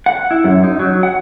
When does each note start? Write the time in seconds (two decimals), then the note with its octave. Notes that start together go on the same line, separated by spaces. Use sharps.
0.06 F#5
0.31 E4
0.44 F#2
0.64 D#4
0.79 F#3
1.03 F#5